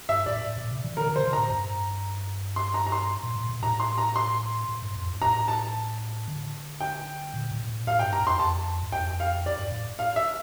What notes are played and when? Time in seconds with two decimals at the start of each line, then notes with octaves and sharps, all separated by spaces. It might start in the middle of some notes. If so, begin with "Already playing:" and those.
0.09 G2 E5
0.26 A2 D5
0.44 A2
0.58 A#2
0.71 C3
0.84 E3
0.97 D3 A#4
1.06 C3
1.10 D3
1.16 C5
1.24 C3
1.33 A2 A#5
1.50 G2
2.56 C6
2.74 A#5
2.87 A#5
2.92 C6
3.23 A#2
3.36 A2
3.49 A#2
3.62 A2 A#5
3.80 C6
3.98 A#5
4.16 C6
4.69 A2
4.82 G2
4.95 F2
5.08 G2
5.22 A2 A#5
5.48 A5
6.28 D3
6.81 G5
7.34 A#2
7.51 A2
7.65 A#2
7.69 A2
7.87 A2 F5
7.99 G5
8.04 G2
8.13 A#5
8.22 F2 C6
8.39 F2 A5
8.83 G2
8.92 F2 G5
9.20 F5
9.46 D5
9.59 G2
9.72 A2
9.99 F5
10.16 E5